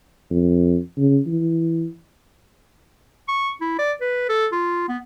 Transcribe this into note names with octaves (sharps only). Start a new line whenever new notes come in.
F2
C#3
E3
C#6
E4
D5
B4
A4
F4
B3